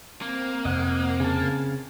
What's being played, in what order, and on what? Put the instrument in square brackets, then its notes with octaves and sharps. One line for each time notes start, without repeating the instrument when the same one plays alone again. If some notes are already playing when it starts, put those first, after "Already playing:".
[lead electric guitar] A#3 [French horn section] C4
[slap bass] F2 C3 [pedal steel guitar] D#5 F#5
[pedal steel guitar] C#3 A5